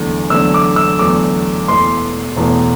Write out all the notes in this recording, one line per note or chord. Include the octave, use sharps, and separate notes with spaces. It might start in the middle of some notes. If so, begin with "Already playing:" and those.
Already playing: E2 D3 F#3 A3
E2 D3 F#3 A3 E6
D6
E6
E2 D3 F#3 A3 D6
E1 E2 B2 A3 C6
E1 E2 B2 A3